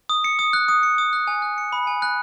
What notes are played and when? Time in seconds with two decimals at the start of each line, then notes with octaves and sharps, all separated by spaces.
0.09 D#6
0.24 C#7
0.39 D#6
0.53 F#6
0.68 D#6
0.83 C#7
0.98 D#6
1.13 F#6
1.27 G#5
1.42 F#6
1.58 C#7
1.73 B5
1.87 G#5
2.02 F#6